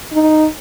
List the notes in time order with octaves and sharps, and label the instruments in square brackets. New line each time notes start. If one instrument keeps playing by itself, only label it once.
[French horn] D#4